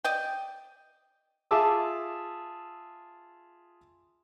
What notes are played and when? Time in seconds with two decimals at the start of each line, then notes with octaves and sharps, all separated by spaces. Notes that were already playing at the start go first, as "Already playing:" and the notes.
0.04 D5 D#5 G5
1.51 F4 G#4 E5 A5 D6 E6